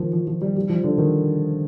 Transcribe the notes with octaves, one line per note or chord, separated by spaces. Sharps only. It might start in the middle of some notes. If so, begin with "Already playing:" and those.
Already playing: D#3 F3
F3
F3
G3
G3
F3
D3
D#3